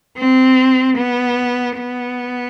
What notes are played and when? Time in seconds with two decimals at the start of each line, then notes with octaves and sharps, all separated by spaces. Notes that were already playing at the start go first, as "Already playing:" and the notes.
0.18 C4
0.97 B3
1.77 B3